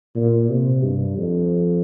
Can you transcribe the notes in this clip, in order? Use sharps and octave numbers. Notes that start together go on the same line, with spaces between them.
A#2
C3
G2
F2